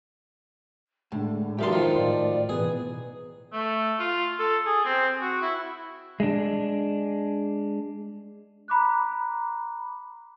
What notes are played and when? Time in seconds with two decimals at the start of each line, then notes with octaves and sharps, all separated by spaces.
1.12 A2 D3 G#3
1.59 B1 E2 G4 A#4 F5 A5 C6
1.73 D#3 F3 F4
1.95 A2 D5
2.49 B2 E3 B3 G#4 B4
3.53 A3
3.99 F4
4.39 A4
4.66 G#4
4.85 C4
5.21 F#4
5.41 E4
6.20 G#3 D4
8.68 A#5 B5 D6 F#6